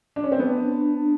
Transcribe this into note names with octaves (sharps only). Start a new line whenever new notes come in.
D4
C#4
C4
B3 D4